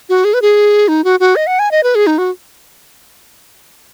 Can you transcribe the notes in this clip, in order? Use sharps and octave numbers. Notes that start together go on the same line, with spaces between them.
F#4
G#4
B4
G#4
D#4
F#4
F#4
D#5
F#5
G#5
D#5
B4
G#4
D#4
F#4